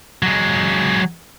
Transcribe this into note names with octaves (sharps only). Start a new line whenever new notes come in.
F#3 G#3